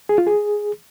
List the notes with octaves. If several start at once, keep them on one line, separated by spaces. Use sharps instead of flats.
G#4
F4
G#4